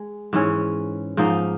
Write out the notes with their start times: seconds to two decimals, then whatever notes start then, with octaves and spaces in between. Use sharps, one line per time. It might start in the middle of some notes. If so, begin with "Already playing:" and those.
Already playing: G#3
0.33 G#2 E3 G#3 C#4
1.17 G#2 F3 A#3 D#4